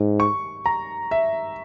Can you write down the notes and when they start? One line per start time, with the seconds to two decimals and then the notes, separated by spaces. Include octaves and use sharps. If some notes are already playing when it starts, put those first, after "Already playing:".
Already playing: G#2
0.20 C#6
0.66 A#5
1.11 E5